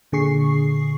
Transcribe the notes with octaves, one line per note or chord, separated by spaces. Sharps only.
A#2 D3 G#4 C#6 C7